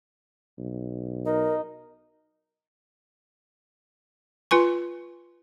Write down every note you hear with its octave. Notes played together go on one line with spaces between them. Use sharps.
B1
D#4 A#4
F4 B4 G#5 C#6